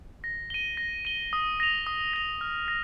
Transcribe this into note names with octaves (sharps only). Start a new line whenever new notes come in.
A#6
D#7 G7
A#6
D#7 G7
D#6
A#6 F7
D#6
A#6 F7
F6
A#6